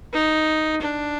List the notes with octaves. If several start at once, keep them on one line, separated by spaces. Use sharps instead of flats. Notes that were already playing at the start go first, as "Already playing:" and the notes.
D#4
D4